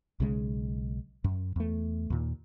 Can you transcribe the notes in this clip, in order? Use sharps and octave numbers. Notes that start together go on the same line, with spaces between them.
B1 C#3 F3 G#3
F#2
E2 A3
D#2 A#2